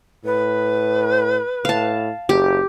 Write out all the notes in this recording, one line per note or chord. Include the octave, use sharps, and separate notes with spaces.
A2 B4
A2 F5 A5
F#1 G4